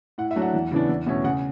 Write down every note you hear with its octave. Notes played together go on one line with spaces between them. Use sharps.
A2 F#5
E5
F#3 A3 D4
F#5
E2
C#3 E3 B3 D4
E2
B2 A3 C#4
C#3 F#5